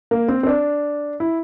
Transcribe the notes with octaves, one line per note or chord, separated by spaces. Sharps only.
A#3
C4
C4
D4
E4